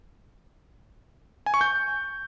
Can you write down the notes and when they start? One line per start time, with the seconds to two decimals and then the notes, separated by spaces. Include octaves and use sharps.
1.46 G#5
1.54 C#6
1.61 G6